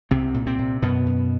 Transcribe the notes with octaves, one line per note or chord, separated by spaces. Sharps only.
C2 C3 C4
A#2
C3 C4
A#2
F#2 B2 B3
F#2